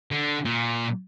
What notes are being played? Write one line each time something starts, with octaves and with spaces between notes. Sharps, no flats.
D3
A#2